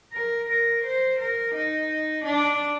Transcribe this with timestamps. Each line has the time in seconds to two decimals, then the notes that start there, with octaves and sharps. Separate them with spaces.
0.13 A#4
0.50 A#4
0.84 C5
1.19 A#4
1.55 D#4
2.25 D4